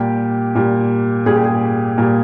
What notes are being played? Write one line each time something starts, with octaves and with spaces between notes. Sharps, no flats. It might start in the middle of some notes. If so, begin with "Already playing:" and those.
Already playing: A#2 G3 G4
A#2 G3
A#2 G3 G#4
G4
G#4
A#2 G3